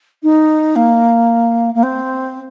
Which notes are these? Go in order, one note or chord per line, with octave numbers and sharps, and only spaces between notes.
D#4
A#3
A#3
C4